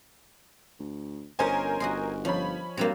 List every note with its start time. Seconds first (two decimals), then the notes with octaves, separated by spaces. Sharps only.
0.79 D2
1.39 G1 C#4 A#4 C5 D#5 G#5
1.80 G1 F#4 D#5 C6
2.25 F3 C#4 C#5 B5
2.77 G2 F#3 G3 A#3 C4